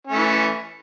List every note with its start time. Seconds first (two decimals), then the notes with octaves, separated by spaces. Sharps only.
0.07 C#4
0.12 A3
0.17 E3